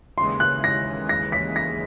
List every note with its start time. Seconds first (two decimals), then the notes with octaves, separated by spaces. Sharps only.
0.17 D#2 C#3 E3 G#3 C6
0.40 F#6
0.64 A#6
1.09 A#6
1.32 B6
1.56 A#6